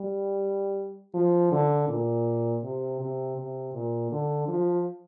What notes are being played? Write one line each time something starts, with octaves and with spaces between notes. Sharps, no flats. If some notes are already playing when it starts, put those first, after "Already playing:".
Already playing: G3
F3
D3
A#2
C3
C3
C3
A#2
D3
F3